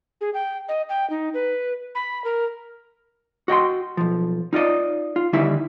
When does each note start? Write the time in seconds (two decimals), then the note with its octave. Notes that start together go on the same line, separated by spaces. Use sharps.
0.21 G#4
0.34 G5
0.69 D#5
0.89 G5
1.10 D#4
1.34 B4
1.95 B5
2.24 A#4
3.48 F#4 D#5 G5 C6
3.97 B1 F3
4.53 D#4 F4 D5 D#5
5.16 F4
5.33 D#2 D3 G3 D#4 E4 E5